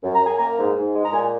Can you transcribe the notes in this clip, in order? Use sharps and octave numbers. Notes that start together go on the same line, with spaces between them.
F#2
A#5
F#2
G#5
A#3 A#5
G#2
G#2
G#3
A#5
A#2 G#5